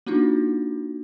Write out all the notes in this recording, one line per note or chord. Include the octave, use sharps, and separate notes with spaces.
A#3 D4 D#4 F4 F#4